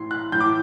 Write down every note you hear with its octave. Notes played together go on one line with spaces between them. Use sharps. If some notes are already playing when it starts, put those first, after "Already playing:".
Already playing: A2 E3 C6
F#6
A2 E3 G6
D6